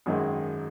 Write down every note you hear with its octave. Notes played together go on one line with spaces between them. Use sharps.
G#1 F#2 D#3 G#3